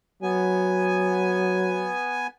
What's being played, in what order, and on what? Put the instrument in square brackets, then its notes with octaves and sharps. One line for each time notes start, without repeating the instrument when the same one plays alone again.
[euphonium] F#3 [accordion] B3 G#5